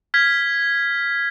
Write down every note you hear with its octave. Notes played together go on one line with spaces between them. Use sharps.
F6 G#6 B6